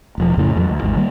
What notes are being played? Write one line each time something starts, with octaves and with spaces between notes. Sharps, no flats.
E1 F3
F2 A2 C#3 E3
F2 E3 F#3
D2
G#1 E2 G#2
D#3 G3 A#3